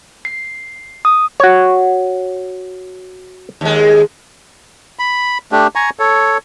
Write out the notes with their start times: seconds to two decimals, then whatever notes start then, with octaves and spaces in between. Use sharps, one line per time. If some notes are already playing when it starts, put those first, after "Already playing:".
0.25 C7
1.05 D#6
1.40 F#4 C#5
3.61 D#2 G#3
4.99 B5
5.52 A3 D4 G4
5.75 G#5 A#5 C#6
5.99 A4 C#5